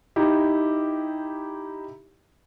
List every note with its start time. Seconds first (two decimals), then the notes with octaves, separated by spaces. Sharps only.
0.16 D#4 E4 G4